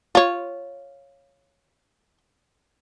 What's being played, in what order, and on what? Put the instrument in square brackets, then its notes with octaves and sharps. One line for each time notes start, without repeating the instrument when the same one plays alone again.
[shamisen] F4 C#5